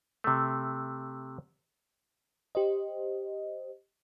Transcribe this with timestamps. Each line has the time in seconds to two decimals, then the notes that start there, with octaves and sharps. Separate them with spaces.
0.24 C3 A3
2.55 G4 C5 D#5